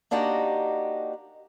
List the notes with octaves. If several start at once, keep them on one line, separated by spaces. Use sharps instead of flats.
A#3 D4 D#4 F#4 G4